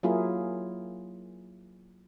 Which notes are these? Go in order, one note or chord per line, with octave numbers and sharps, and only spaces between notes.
F#3 A#3 E4 F4 G#4 A#4